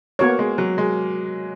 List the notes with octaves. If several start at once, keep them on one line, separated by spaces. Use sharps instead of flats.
A#3 B3 F#4 A#4 C#5
G#3
F#3
G#3